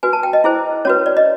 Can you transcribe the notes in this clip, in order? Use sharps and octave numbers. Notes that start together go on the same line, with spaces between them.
F#4 B4 G#5
A5
G5
D#5
E4 G#4 C5
C#4 F#4 B4 C#5
D5
D#5